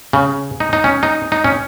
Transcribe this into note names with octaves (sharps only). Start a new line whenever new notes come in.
C#3
D#4
D#4
C#4
D#4
D#4
C#4